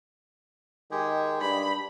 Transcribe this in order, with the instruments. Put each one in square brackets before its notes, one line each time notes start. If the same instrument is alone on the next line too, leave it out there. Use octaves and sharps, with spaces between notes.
[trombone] D#3 [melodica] G#3 G4 G#4
[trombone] G2 [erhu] B5